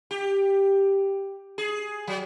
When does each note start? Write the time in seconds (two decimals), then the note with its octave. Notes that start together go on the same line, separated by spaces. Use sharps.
0.11 G4
1.58 G#4
2.08 F#3